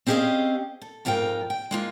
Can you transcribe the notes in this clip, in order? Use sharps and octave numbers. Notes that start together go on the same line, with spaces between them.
C4 C#4 G4 G#4 D#5 F5
A4
F2 G#2 F4 A#4 G5
G5
G#3 A#3 F4